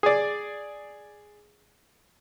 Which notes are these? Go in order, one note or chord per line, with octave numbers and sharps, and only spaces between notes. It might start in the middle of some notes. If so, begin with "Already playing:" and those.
G#4 D5